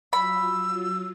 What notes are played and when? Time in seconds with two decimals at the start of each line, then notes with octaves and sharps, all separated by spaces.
0.13 F#3 F4 B5 E6